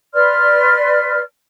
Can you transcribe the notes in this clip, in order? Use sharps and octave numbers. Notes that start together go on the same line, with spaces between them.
B4 D5 C6 F6